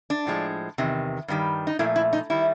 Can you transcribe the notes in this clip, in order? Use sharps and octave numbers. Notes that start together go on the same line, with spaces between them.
D4
A2 F3 G#3
E2 C3 D#3
G2 D#3 G3
D#4
A#2 F3 A3 E4
E4
D#4
D#3 G3 E4